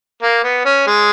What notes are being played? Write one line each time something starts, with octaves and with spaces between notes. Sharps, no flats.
A#3
B3
C#4
G#3